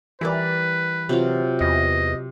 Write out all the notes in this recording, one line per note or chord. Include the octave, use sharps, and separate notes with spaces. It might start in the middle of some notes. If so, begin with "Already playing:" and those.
E3 G3 A#4 B4 D5
C3 F#3 F4
E2 D#5